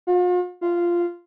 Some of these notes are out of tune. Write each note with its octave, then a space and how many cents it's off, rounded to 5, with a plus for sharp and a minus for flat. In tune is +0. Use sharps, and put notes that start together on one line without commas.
F4 +45
F4 -10